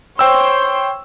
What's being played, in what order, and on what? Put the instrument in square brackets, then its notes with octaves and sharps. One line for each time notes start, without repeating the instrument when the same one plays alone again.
[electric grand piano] C5 G5 E6 [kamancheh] C#5 C6